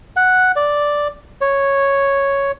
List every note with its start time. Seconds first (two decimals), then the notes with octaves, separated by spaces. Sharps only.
0.16 F#5
0.56 D5
1.41 C#5